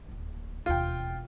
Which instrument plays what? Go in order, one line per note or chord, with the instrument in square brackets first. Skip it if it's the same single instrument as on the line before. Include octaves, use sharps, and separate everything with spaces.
[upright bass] D1 D#2
[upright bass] E1 D#2 [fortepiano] F4 G5